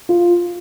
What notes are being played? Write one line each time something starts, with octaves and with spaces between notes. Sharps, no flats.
F4